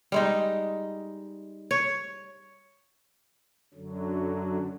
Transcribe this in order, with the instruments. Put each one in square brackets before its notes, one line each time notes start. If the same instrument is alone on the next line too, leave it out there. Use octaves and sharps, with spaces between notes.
[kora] G3 G#3 D#4
C#5
[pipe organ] F#2 D3 F#3